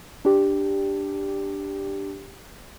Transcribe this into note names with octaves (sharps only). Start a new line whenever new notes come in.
D4 G4